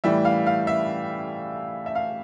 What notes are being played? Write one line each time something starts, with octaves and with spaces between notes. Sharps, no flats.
A2 E3 G3 E5
F5
F5
E5
E5
F5